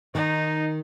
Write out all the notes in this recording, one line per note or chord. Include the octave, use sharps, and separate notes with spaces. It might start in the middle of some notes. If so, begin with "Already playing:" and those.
D#3 D#4